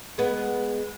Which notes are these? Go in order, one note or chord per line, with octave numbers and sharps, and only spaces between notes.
G#3 B3